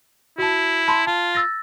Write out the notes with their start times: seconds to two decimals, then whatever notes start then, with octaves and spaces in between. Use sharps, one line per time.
0.38 E4 F#4 A5
0.88 A5 B5 C6
1.07 F4 A5
1.35 E6 A6 A#6